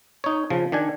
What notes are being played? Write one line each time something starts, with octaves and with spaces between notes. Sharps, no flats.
D#4 C#5
C#3 F3
D#3 D4 G#5